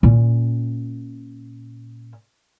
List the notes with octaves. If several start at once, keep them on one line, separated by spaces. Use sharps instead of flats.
A#2 C#4